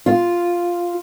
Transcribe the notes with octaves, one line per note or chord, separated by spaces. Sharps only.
F4